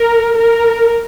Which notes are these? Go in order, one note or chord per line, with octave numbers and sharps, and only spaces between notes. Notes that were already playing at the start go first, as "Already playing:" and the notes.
Already playing: A#4
A#4